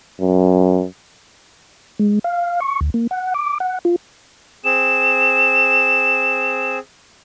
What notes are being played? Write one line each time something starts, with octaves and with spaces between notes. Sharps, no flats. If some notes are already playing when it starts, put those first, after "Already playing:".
F#2
G#3
F5
C#6
D2
A#3
F#5
D6
F#5
F4
C4 G#4 E7